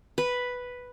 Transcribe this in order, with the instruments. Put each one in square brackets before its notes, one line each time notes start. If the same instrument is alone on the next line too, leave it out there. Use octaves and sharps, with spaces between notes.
[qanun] B4